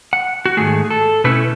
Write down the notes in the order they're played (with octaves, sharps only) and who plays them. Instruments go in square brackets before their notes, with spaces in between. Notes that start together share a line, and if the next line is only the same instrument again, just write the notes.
[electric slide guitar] F#5
F#4
G#2 D#3 A3 G#4
A4
B2 A3 C#4 E4 B4